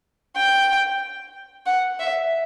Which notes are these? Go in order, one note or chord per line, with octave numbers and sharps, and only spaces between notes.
G5
F#5
E5